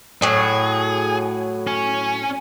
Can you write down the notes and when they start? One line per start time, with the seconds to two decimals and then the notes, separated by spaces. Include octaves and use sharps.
0.22 A2 F#3 G#4
1.67 C#4